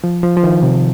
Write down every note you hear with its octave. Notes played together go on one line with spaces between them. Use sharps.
F3
F3
F3
D#3
C3